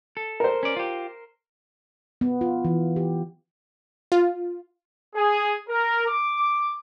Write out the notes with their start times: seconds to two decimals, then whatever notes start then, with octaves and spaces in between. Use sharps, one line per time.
0.17 A4
0.40 A#4 C5
0.63 C#4 D5
0.77 F4 G4
2.21 B3
2.41 F4
2.65 E3
2.96 G4
4.12 F4
5.15 G#4
5.69 A#4
6.07 D6